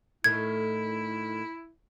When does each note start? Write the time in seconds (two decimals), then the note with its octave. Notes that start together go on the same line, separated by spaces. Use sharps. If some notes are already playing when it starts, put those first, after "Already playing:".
0.24 A2 D#3 A3 E4 G#6